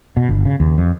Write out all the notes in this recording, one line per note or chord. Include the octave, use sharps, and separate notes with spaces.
B2
G1
C#3
D#2
F2